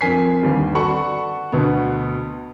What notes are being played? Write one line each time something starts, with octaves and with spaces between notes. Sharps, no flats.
F2 C4 A#4 G#5 B6 C7
G1 D#2 G3
F#4 A4 D5 F#5 B5 C#6
D2 B2 B3